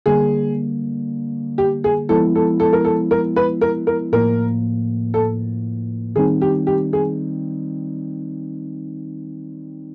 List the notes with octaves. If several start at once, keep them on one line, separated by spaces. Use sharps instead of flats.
D3 G3 A#3 G#4
G4
G#4
F3 G#3 B3 E4 A4
A4
A4
A#4
A4
A#4
B4
A#4
A#4
A2 F3 A#3 A#4
A4
D#3 G3 C4 D#4 G#4
G4
G4
G#4